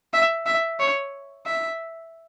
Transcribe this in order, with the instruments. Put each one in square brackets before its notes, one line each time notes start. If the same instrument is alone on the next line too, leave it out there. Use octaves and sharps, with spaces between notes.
[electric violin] E5
E5
C#5
E5